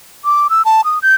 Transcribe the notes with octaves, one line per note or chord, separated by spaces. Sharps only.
D6
E6
A5
D#6
G6